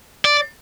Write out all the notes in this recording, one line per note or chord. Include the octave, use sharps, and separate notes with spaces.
D5